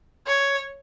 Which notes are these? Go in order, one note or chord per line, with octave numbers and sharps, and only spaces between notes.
C#5